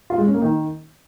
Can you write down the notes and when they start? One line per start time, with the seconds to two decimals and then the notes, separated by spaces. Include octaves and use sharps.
0.10 F4
0.18 G#3
0.26 C#4
0.34 A#3
0.42 D#3